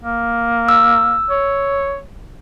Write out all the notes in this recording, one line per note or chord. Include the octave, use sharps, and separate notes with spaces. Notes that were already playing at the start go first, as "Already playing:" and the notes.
A#3
E6
C#5